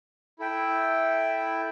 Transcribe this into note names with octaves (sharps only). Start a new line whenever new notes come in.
E4 A4 E5 G5